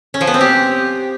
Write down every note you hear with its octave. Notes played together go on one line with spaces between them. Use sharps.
C#4
F3
B3
C4
G4